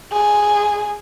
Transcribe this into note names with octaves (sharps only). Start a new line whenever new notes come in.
G#4